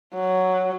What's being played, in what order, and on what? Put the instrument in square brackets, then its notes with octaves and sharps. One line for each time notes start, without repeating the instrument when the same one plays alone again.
[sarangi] F#3